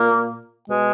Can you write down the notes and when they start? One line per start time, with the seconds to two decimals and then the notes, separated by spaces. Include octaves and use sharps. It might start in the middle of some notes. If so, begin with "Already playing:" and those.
Already playing: A#2 A#3
0.68 B2 G#3